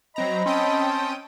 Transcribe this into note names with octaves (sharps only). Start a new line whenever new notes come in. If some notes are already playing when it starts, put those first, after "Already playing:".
F#3 C4 D#5 A#5 B5
C4 C#4 G5 A5 D#6